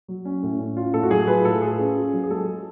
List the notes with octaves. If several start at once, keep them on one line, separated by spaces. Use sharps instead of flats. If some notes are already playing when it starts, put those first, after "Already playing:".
F#3
C#4
A2
C#4
F4
A2 A4
F#4
F#3 G#4
F4 B4
A2 A4
F4 G#4
C#4
F4
F#3
G#4
G#3 A4